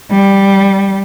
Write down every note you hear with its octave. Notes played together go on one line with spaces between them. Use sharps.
G3